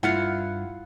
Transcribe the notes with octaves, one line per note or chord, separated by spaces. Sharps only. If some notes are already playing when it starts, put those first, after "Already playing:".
G2 E4 F4 F5 F#5